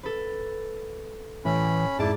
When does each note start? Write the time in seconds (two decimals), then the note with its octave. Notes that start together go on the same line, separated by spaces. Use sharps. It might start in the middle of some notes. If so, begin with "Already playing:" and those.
0.03 A4 B4
1.45 A2 E3 C#4 B5
1.99 F2 G#2 E4 D5 A5